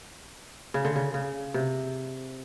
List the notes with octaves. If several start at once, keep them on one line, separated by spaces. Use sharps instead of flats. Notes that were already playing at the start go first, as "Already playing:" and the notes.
C#3
D3
C#3
C#3
C3